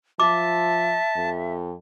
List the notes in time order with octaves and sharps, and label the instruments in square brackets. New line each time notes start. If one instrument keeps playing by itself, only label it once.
[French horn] F3 [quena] E5 [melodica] A5 [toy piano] D6
[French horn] F2